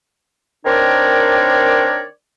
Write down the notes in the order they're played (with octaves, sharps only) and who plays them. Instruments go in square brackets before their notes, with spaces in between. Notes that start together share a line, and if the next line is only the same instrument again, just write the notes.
[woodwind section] D#3 C4 D4 A#4 C#5 D5